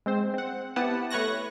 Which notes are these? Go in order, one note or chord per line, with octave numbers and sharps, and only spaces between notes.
G#3 C4 C5
C4 F#5
B3 E4 G4 B4 F#5 A5
A3 B4 C#5 C#6 F#6 A#6